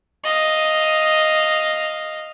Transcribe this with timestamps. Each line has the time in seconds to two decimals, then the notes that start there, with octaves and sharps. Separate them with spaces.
0.23 D#5 F5